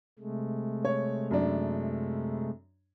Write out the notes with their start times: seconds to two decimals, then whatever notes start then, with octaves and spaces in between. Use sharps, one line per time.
0.19 C3 G#3 A3
0.85 C#5
1.31 F#2 D4